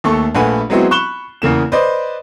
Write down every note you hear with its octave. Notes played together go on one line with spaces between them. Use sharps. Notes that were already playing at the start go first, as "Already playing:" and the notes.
D#2 A3 A4 C#6
A#1 A3 B4 F#5 G#5 B5
F#3 G#3 B3 C4 E4 F#4
B5 C#6 F#6 E7 G7
E2 C#3 A#3 E7
B4 C5 D5 D#5